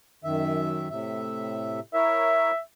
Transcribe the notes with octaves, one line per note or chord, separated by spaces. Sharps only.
F#2 D#3 E5
A2 C3 E5
E4 A#4 C#5 E5